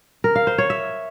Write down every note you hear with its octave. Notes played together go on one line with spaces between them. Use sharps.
A#4
F5
C5
C#5
E5